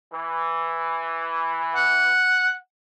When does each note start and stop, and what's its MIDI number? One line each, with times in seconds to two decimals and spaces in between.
0.13 2.16 52
1.75 2.52 78